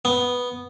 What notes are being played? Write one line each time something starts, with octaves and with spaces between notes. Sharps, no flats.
B3